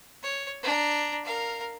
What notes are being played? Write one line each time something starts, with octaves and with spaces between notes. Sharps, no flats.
C#5
D4 A#5
A#4 F5